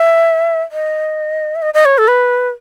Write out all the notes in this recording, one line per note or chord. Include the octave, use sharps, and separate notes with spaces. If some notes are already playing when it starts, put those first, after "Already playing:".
Already playing: E5
D#5
E5
D#5
D#5
C#5
A4
B4